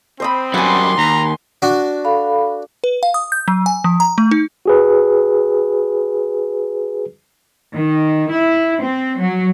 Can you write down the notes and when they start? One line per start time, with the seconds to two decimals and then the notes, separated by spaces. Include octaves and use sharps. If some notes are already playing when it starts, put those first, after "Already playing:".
0.20 C4 C5 D#5 B5
0.54 F#2 G3 F#5 G#5 C6
0.98 D#2 A#5
1.62 D4 F#4
2.05 A4 F5 B5
2.84 B4
3.03 F5
3.14 D#6
3.32 G6
3.48 F#3
3.66 G#5
3.84 F3
4.00 A#5
4.18 A3
4.31 D#4
4.66 F#4 G#4 B4
7.73 D#3
8.30 E4
8.82 C4
9.19 F#3